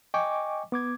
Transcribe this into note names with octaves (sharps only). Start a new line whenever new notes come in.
D#5 G5 G#5 C#6 D6
B3 D6 G#6